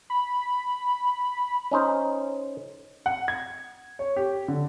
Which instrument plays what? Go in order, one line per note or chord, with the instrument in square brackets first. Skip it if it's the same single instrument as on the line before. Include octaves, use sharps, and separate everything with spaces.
[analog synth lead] B5
[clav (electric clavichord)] C#4 D#4 C5
[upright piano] F#5
G#6
C#5
G4
D3